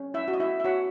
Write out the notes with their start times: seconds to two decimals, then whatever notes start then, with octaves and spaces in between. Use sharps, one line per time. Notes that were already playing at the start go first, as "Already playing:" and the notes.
Already playing: C#4
0.14 E4 E5
0.28 F#4
0.33 D#5
0.40 E4 E5
0.60 E5
0.65 F#4 C#5 F#5